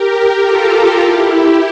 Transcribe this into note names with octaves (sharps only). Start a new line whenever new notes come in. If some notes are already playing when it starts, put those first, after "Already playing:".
Already playing: G4 A#4
F4 A4
E4 G4